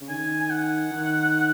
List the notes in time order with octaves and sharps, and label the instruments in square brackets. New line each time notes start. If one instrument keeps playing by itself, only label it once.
[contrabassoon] C#3
[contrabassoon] D#3 [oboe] G#5
[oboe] G#5
F#5
[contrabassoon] D#3